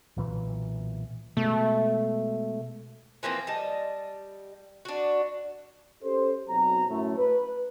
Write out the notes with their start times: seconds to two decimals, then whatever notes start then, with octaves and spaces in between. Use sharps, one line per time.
0.17 B1 A#2 E3
1.37 B2 G#3 A3
3.23 E3 F3 A#3 C4
3.47 G3 D#5 A5
4.85 D4 F#4
6.03 C#4 G4 A4 C5
6.49 B1 F#3 C4 A#5
6.89 F#2 A2 A3
7.18 B4